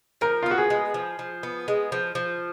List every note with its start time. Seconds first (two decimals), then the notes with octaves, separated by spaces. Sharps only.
0.21 F3 A#4
0.43 F4
0.46 B3 F#4
0.58 G#4
0.70 G#3
0.94 F3
1.19 F3
1.43 B3
1.68 G#3
1.92 F3
2.15 F3